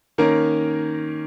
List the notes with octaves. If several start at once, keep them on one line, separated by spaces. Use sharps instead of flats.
D#3 A#3 C#4 A#4